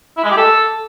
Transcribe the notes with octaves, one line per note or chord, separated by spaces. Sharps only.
E4
G#3
G4
A4